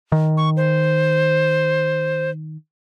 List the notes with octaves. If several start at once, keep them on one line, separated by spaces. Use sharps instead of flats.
D#3
C#6
C5